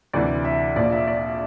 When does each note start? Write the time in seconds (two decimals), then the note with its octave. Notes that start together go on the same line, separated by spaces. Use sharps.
0.13 D2 C3 E3 D5
0.45 E5
0.76 A#1 A#2 F3 D5
0.92 E5
1.07 D5